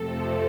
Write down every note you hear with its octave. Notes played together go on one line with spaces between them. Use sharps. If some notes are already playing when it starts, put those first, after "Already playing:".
Already playing: F2 C3 F3 A3 C4 A4